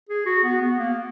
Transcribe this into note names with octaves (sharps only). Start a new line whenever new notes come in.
G#4
F#4
B3
B3
A#3